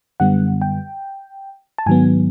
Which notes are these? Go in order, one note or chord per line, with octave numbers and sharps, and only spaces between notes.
F#2 D3 G3 B3 F#5
G5
A5
G#2 D#3 F#3 B3 G#5